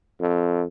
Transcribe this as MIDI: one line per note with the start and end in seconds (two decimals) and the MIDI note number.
0.21 0.64 41